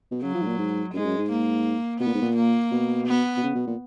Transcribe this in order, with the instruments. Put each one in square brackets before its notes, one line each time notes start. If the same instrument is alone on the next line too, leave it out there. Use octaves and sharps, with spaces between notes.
[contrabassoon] B2
[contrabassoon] C#3 [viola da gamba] F#3
[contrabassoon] F3
G#2
A#2
G#2
[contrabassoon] F#2 [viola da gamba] G#3
[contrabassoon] G#2
F#2
G#2
[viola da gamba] A#3
[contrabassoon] B2 [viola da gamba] B3
[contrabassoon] A#2
G#2
A#2
[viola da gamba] A#3
[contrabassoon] B2
[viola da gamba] B3
[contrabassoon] B2
C#3
B2
A#2